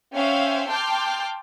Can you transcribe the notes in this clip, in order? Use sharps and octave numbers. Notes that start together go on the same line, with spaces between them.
C#4 C5 C#5 E5 F5 G5
G5 A5 C6 D6 F6 G6